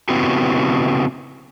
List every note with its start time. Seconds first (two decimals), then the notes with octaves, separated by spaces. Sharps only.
0.09 C#3 B3 C4 E4 F#4 G4